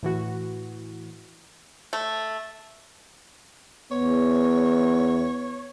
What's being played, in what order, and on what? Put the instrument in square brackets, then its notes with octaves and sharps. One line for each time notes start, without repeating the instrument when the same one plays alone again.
[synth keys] A2 E3 F#4
[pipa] A3
[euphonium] E2 [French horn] B3 [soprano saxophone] C#5